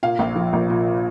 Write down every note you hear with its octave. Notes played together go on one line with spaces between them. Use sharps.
A#2 F5
A#1
F3
A#1
A#2